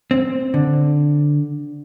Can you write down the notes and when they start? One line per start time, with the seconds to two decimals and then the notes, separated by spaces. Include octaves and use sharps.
0.11 C4
0.54 D3